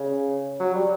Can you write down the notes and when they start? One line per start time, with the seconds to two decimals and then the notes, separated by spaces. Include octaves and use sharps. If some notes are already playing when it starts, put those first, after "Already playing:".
Already playing: C#3
0.60 F#3
0.75 G3